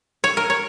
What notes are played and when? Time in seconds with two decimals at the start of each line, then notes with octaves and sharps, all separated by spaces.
0.24 C#5
0.37 A#4
0.50 C#5